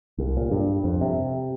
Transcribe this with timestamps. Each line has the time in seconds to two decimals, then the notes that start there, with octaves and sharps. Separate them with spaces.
0.18 C2
0.37 A#2
0.51 G2
0.84 F2
1.01 C3